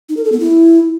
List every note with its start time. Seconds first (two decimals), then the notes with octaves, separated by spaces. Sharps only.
0.09 D#4
0.17 A#4
0.25 A4
0.32 B3
0.40 E4